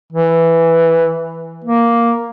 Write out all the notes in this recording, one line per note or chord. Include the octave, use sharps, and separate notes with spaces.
E3
A#3